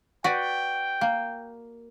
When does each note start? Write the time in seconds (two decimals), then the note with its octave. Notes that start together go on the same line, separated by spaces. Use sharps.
0.24 F#4 B4 D5 G5
1.01 A#3